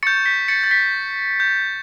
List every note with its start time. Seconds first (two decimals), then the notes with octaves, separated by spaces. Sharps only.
0.03 C#6 G6 A6 C#7
0.26 B6
0.48 A6 C#7
0.64 A6
0.71 B6
1.40 G6